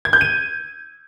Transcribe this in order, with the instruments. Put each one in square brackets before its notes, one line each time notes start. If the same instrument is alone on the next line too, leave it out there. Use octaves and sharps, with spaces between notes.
[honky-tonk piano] G#6
G6
D#7